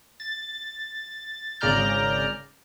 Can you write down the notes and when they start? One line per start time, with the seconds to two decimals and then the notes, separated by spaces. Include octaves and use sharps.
0.20 A6
1.60 G#1 C#3 D5 A#5 F6 G6